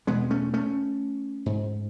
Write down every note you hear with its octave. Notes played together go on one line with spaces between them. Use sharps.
E2 B2 G#3 B3
A3 C#4
A3 C#4
G#2